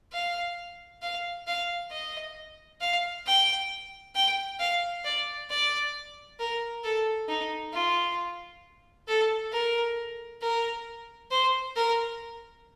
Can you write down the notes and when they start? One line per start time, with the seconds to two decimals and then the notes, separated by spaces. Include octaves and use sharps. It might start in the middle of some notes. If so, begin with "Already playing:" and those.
0.13 F5
1.02 F5
1.47 F5
1.91 D#5
2.81 F5
3.27 G5
4.15 G5
4.60 F5
5.05 D5
5.50 D5
6.40 A#4
6.84 A4
7.28 D#4
7.73 F4
9.08 A4
9.52 A#4
10.42 A#4
11.31 C5
11.76 A#4